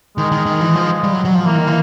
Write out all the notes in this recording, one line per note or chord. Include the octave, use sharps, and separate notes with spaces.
D#3 G#3
D#3
D#3
E3
F3
G3
F#3
F#3
F3
E3 A#3
D#3
E3